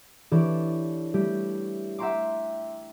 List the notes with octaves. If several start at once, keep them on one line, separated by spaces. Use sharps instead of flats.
E3 D4 G4 A4 C#5 D5
G3 A3 G4
E5 F#5 G5 A#5 C6 D6